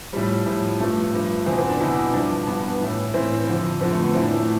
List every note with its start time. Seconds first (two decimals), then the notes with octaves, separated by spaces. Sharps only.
0.13 A2 F3 G3
0.46 A2 F3
0.80 G2 F3 A3
1.13 G2 F3
1.46 E2 C4
1.51 B2
1.58 C4
1.69 D4
1.80 E2 B2 E4
2.14 G2 F3 D4
2.47 G2 F3 B3
2.80 A2 E3
3.14 A2 E3 C4
3.47 F2 D3 F3
3.81 F2 D3 F3 C4
3.92 A3
4.03 B3
4.14 A2 E3 C4
4.23 D4
4.31 E4
4.40 A3